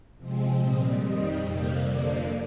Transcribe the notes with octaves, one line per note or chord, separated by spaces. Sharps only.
C3 F3 G#3 C4
A#2 G3 C4 D#5
F2 D#3 G3 D#5
F2 C3 G3 A#3
F2 D3 F3 A#3 D5